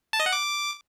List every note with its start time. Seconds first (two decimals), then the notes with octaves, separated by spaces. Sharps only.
0.13 A5
0.20 D#5
0.26 F#5
0.32 D6